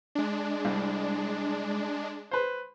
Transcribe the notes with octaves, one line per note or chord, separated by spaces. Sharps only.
G#3 D4
C2
B4 C5